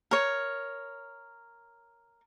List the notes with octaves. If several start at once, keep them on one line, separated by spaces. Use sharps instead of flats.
A#4 C#5